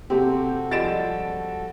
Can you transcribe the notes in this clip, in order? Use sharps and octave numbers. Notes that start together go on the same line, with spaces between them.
C3 C4 F#4 G4 A4
F3 G3 G#3 A6 D7 E7